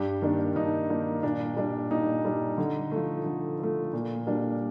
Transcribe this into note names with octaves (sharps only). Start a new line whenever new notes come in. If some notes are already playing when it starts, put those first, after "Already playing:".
Already playing: G2 G4
D#3 A#3 D4
G2 D#4
D#3 A#3 D4
A#2 D4
G3 D4
A#2 D#4
G3 D4
D3
F3 A3
D3
F3 A3
A#2
G3 A#3 D4